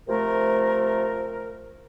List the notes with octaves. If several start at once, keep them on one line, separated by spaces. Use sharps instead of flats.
C3 F3 A3 A#4